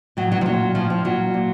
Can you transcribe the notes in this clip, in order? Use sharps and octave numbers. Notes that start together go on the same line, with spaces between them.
A2 F#3
F#3
F3
A#2 F#3
A2 F3
F3
A#2 F#3
A#2